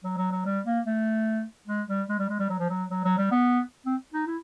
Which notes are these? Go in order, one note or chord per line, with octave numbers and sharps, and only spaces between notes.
F#3
F#3
F#3
G3
A#3
A3
G#3
G3
G#3
G3
G#3
G3
F#3
F3
F#3
F#3
F#3
G3
B3
C4
D#4
E4